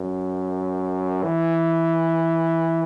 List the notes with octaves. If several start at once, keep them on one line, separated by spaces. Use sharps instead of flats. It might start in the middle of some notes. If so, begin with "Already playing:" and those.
Already playing: F#2
E3